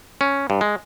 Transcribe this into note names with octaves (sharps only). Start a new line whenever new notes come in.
C#4
G2
G#3